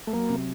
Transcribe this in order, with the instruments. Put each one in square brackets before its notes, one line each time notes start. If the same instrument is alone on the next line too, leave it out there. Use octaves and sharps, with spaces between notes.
[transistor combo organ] A3
[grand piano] F#3 [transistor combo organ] A#3
[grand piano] C3